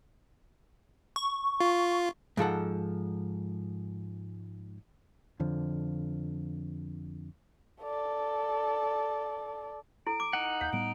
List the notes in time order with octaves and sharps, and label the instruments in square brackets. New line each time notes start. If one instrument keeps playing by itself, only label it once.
[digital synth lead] C#6
[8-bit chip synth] F4
[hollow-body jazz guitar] G#2 F3 A4 F#5
[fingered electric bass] F2 D3 F3
[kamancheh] A4 D5
[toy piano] E4 A4 [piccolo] D7
[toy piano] D6
[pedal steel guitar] D#4 F#5
[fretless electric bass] D#2 [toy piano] F5 [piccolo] G6
[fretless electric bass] A2 G3 B3 [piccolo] D7